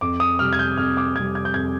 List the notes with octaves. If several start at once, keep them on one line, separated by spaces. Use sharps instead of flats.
F2 D6
D#6
C3 G3 F6
G#6
G6
F2 F6
D6
C3 G3 G#6
G#6
G6
F2 G#6